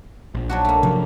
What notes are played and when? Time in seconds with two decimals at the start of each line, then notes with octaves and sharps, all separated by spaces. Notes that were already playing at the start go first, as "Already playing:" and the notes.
0.35 A#1
0.49 F#3 D4 F#4
0.65 A3 A#3
0.83 F#2 C3 F3 F#3